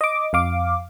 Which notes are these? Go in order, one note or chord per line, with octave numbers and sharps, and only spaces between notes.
D#5 D6
F2 F5 D6